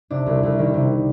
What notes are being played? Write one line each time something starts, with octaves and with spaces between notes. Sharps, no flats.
C3 D4
C2
C2
D#3
C3